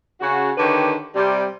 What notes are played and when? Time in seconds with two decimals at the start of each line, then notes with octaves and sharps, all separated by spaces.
0.21 C#3 F#4
0.57 D3 D#3 G4 B4 C#5
1.15 C3 G3